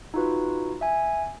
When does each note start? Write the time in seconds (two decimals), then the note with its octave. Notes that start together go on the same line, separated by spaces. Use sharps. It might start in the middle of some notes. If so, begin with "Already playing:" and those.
0.14 D#4 F4 F#4 B4
0.81 E5 G#5